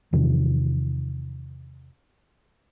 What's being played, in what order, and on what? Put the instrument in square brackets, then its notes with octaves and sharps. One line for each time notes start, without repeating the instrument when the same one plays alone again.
[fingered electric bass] E2 C3 D#3 F3